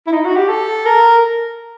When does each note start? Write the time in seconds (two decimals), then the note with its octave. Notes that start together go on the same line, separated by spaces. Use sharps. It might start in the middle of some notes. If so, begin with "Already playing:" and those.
0.07 E4
0.12 D#4
0.25 F#4
0.37 G4
0.49 A4
0.86 A#4